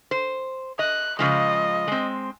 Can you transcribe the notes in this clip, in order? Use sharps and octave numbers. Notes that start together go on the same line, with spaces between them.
C5
D#5 F#6
C#3 F3 G#3 D#5
G#3 C4